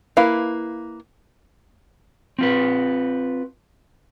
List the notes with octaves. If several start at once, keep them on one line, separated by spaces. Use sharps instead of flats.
A#3 E4 B4 F5
C4 F4 B4